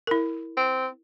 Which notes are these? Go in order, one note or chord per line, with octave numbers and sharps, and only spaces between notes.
E4 A#4
C4